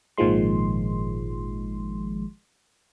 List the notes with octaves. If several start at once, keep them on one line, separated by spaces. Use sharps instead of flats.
G#1 A#2 D#3 F3 G#3 C6